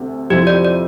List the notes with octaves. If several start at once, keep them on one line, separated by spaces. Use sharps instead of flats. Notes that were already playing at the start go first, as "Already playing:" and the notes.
Already playing: D2 C3
F2 C3 F3 C4 E4 G4
D5
D5